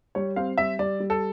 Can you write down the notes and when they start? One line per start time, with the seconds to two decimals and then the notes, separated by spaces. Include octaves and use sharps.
0.15 G3 C#5
0.36 C4 F5
0.58 G3 E5
0.79 G3 D5
1.00 G3
1.10 A4